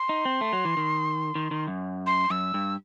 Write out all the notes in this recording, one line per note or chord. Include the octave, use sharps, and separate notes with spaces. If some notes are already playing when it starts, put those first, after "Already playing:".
Already playing: C6
D#4
C4
A3
F#3
E3
D#3
D#3
D#3
F#2
C6
F#2 E6
G2